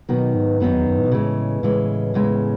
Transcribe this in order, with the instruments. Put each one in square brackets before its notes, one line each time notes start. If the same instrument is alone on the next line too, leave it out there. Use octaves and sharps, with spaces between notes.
[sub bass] B2 [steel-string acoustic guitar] D#3 F#3 B3 D#4
[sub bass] G#2
[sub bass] F#2 [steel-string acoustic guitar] D#3 F#3 B3 D#4
[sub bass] E2
F#2
A2
B2
[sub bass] A2 [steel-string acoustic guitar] C#3 E3 G#3
[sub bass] A2 [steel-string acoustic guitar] C#3 E3 G#3
[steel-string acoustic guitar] E2 C#3 G#3